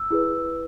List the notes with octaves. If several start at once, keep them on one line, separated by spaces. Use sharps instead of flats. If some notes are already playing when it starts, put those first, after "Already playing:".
Already playing: E6
E4 G#4 B4